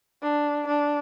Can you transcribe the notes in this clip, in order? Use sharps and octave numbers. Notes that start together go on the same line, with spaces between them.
D4
D4